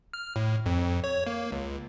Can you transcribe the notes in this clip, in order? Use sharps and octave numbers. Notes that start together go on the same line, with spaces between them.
F6
A2
F2
C#5
A#3
C#2